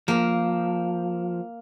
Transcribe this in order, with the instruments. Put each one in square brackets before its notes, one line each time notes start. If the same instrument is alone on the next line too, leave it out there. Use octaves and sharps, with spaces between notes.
[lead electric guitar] F3 [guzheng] A#3